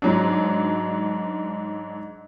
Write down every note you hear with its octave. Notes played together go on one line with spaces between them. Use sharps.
G#2 F#3 D4